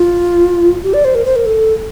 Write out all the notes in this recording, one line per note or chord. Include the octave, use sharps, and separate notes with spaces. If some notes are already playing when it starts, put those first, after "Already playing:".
Already playing: F4
G4
D5
C5
A#4
C5
A#4
A4